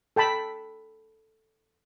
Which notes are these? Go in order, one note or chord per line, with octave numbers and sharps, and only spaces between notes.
A4 G5 A5 B5